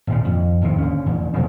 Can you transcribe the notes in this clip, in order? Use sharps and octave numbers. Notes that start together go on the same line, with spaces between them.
G#1 A#2 C#3
F2
G#1 D#2 C3
D3 C#4
A1 E2 E3
B2 F3 G#3 B3